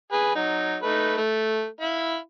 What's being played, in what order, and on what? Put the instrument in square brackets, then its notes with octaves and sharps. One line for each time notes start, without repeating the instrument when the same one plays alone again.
[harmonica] G#4 B4
F#3 D#4
A3 D#4 B4
A3
E4 F5 B5